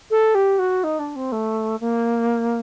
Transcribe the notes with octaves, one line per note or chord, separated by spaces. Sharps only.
A4
G4
F#4
D#4
D4
C4
A3
A#3